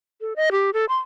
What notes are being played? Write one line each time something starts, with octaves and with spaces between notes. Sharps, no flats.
A4
D#5
G4
A4
C6